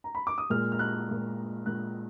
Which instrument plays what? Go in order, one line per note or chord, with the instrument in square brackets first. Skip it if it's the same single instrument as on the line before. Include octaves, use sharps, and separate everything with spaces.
[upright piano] A#5
B5
D6
D#6
A#2 G#3 F6
F6
F#6
A#2 G#3
A#2 G#3 F#6